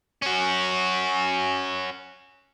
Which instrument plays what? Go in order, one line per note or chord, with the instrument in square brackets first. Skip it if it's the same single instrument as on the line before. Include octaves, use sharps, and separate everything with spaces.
[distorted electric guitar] C#4 F#4